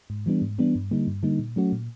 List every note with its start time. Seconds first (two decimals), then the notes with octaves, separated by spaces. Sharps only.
0.10 G#2
0.26 E3 G3 B3 D4
0.42 G#2
0.58 E3 G3 B3 D4
0.75 G2
0.91 D3 G3 A#3 D#4
1.07 G2
1.23 D3 G3 A#3 D#4
1.39 A#2
1.56 F#3 A3 C#4 F#4
1.72 A#2